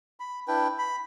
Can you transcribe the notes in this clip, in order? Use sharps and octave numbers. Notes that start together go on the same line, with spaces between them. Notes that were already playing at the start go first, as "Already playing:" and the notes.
B5
D4 E4 B4 G5
B5